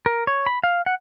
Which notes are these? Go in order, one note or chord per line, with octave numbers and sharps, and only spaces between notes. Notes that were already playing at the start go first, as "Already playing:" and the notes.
A#4
C#5
B5
F5
F#5